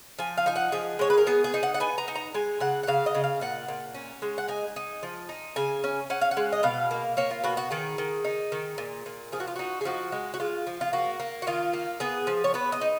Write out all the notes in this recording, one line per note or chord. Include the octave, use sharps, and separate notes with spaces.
F3 G#5
F5
D#4 G#5
F#5
F3 G#4
G#3 C#5
B4
A#4
B3 G#4
G#4
D#4
F#5
F#5
B3 G#5
A#5
D#4
A#5
G#3 G#5
C#3 F#5
F#5
C#3 F5
D#5
C#3
F5
A#2 F#5
A#2
C#4
G#3
F#5
D#4 G#5
D#4
F3
D#4
C#3 G#5
C#4
C#4 F#5
F5
F#5
G#3
D#5
B2 F5
A#3
A#3 C#5
F4
B2 F#4
F#4
D#3 G#4
D#3
D#4
D#3
A#2
A#2
F3 G#4
F#4
F4
D#4 F#4
G#4
F3 F#4
G#3
F#4
G#3 F4
F3
F4
A#3 F#4
A#3
F#4
D#3 F4
A#3
B3 G#4
F3
C#5
B3 B4
D#5
D#4